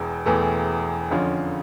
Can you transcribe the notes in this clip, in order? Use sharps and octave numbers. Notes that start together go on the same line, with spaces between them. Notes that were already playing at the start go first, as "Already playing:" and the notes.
Already playing: E1 E2 E3
E1 E2 E3 A3
F2 D3 F3 C#4 F4